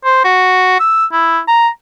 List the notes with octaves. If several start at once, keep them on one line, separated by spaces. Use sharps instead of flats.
C5
F#4
E6
E4
A#5